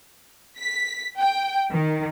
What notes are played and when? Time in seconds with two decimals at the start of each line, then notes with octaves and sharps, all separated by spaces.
0.59 B6
1.18 G5
1.72 D#3